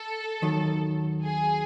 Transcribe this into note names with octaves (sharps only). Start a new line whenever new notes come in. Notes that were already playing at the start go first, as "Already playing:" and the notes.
Already playing: A4
D#2 D#3 F#3
G#4